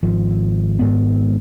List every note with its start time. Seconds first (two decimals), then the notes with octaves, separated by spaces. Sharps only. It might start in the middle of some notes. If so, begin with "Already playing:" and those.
0.03 G#1 F3
0.79 G#1 G#2 B3